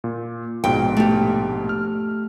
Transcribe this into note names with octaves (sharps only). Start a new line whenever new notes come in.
A#2
A#1 G#2 B2 G5
A3 G4
F6